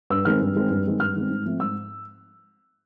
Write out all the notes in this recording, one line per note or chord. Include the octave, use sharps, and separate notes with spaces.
G2 E6
D#3 G#3 C4 F6
G2
D#3 G#3 C4
G2
D#3 G#3 C4
G2 F6
D#3 G#3 C4
G#2
F3 A3 C4
G#2 E6